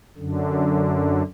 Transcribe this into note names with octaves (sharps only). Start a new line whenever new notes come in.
F#2 D3